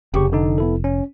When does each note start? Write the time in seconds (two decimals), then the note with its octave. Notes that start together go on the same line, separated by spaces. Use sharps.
0.14 F1 C#3 G4 C#6
0.33 D3 D#4
0.58 B3 E4 A4
0.84 C#4